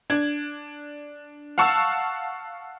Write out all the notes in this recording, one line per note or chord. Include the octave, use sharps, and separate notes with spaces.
D4 G#6
F5 F#5 A5 C#6 E6